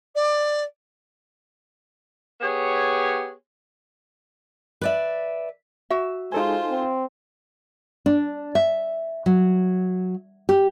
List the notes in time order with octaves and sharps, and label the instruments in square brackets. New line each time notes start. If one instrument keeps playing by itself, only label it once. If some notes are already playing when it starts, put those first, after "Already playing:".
[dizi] D5
[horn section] B3 G4 G#4 C#5
[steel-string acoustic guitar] B4 D5 E5
[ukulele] F#4 E5
[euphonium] G#3 [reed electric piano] D#4 A4 G#5 [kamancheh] F4 C5
[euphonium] C4
[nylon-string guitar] D4
E5
F#3
G4